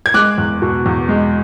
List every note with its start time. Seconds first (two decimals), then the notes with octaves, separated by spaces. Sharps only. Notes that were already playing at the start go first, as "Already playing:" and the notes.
0.06 G#6
0.14 G#3 D6 F#6
0.38 E2
0.62 B2
0.86 E2
1.09 G#3